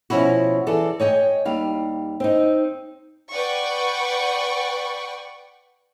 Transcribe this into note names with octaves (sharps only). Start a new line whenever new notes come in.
B2 F3 C#4 E4 F#4
E3 G#4 A4 D5
C#5 D#5 G5 G#5
D#2 G3 F5
C4 D#4
B4 D5 F#5 G5 C#6